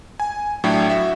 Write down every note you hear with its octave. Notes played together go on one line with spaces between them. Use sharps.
G#5
A2 F#3 D4 E4 G5
F#4 E5